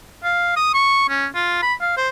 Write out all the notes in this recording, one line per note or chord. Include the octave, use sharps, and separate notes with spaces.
F5
D#6
C#6
C#4
F4
B5
F5
C5